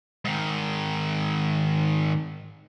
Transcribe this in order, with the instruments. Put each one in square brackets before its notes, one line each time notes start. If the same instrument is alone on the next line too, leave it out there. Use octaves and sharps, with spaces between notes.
[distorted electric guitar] G#2 D#3